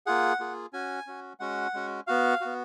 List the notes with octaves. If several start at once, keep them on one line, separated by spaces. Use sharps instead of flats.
A#3 F4 G#4 F#5
A#3 F4 G#4
C#4 F#4 G#5
C#4 F#4
G#3 C#4 F#4 F#5
G#3 C#4 F#4
B3 F#4 F5
B3 F#4